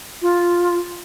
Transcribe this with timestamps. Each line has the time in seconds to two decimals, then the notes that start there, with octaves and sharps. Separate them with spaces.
0.22 F4